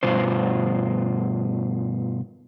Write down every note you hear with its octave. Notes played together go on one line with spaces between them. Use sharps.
G2 B2 F4 C5